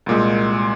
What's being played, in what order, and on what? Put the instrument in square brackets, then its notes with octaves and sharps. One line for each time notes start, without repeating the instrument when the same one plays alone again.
[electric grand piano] C2 A#2 G#3